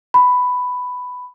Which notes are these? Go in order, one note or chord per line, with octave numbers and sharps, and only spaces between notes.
B5